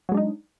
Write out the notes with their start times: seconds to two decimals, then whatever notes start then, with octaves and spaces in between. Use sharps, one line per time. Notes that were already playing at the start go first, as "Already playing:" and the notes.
0.09 F#3
0.12 G#3
0.14 D4
0.17 D#4